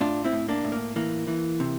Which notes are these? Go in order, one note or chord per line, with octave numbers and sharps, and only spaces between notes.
A2 D4 F4
C4 E4
A2
A#3 D4
A2
A#3
E3 A#3
E3
C3